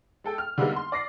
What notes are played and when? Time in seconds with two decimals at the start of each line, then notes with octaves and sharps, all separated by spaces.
0.24 G#3 A4 G5
0.38 F6
0.58 D3 G3 G#3 A#3 B3 D#4
0.76 C6
0.92 D5 A#6 C7